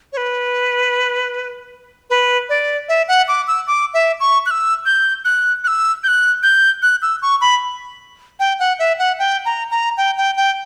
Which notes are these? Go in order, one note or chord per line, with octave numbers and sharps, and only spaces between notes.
C#5
B4
B4
D5
E5
F#5
D6
E6
D6
E5
C#6
F#6
E6
G6
F#6
F#6
E6
G6
F#6
G6
F#6
E6
C#6
B5
G5
F#5
E5
F#5
G5
A#5
A#5
G5
G5
G5